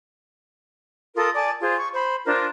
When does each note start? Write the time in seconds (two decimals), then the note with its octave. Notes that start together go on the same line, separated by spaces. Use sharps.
1.15 F4 A4 A#4 D#6
1.34 D5 G#5 A5
1.60 F4 G#4 C5
1.77 C#6
1.93 C5 B5
2.26 D4 F4 A#4 C5